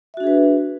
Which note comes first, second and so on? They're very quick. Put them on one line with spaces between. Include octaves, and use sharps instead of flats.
E5 F#4 D4 G#4 B4